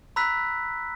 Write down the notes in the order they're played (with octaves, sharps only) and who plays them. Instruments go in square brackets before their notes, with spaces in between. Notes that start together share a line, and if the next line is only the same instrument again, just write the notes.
[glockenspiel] A#5 B5 E6 F#6 B6